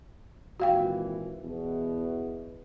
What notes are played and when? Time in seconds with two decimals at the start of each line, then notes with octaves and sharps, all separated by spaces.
0.60 G#1 A#2 E3 F#4 F5 G5
1.43 E2 B2